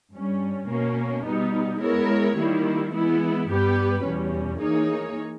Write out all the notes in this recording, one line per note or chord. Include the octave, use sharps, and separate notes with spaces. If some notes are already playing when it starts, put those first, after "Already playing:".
G2 G3 C#4
B2 A#3 C#4
B2 G3 B3 D#4
G#3 B3 E4 A#4 C#5
D#3 G3 A#3 E4
E3 G#3 B3 E4
G2 G3 B3 G4 B4
E2 B2 G3 C#4
E3 A#3 D#4 G#4 C#5